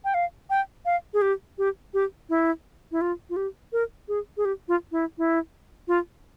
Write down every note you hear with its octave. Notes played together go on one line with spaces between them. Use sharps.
G5
F5
G5
F5
G#4
G4
G4
G4
E4
E4
F4
F4
G4
A#4
G#4
G#4
G4
F4
E4
E4
F4